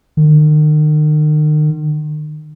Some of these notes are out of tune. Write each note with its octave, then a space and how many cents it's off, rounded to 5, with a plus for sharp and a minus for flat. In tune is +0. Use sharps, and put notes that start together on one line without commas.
D#3 -40